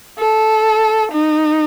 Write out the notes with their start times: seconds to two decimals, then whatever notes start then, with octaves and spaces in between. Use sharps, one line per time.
0.19 A4
1.12 D#4